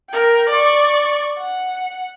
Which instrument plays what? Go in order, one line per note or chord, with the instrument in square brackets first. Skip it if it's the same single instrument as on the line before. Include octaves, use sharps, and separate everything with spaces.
[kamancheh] A#4 G5
D5 C#6
F#5